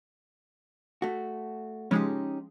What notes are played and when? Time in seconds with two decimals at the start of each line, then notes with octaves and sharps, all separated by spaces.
1.02 A3 F#4
1.91 C#3 F3 G#3 C#4 D#4 G4